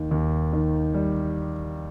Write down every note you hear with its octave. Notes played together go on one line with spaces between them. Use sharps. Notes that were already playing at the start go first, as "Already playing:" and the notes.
Already playing: D#2 D#3
D#2
D#3
G3